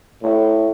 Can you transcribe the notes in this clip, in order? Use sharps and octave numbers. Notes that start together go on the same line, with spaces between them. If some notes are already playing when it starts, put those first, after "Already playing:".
A2